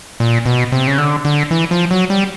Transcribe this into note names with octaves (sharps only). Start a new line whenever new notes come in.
A#2
B2
C3
C#3
D3
D3
E3
F3
F#3
G3